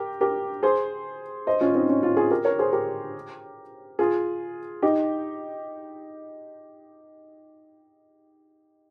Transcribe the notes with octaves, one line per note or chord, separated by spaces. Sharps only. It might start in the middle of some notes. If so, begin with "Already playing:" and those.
Already playing: G4 A#4
G4 A#4
G#4 C5
C5 D#5
C#4 F4
C4 D#4
C#4
C#4 F4
F4 G#4
G4 A#4
A#4 C#5
G#4 C5
G4 A#4
F4 G#4
D#4 G4